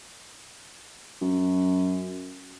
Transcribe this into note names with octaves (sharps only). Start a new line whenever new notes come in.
F#2